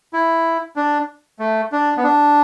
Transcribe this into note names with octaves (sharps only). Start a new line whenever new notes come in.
E4
D4
A3
D4
B3
D4